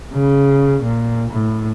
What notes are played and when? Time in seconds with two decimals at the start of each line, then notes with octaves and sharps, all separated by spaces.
0.13 C#3
0.83 A#2
1.30 A2